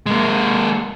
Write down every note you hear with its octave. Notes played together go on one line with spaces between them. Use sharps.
G#3 A#3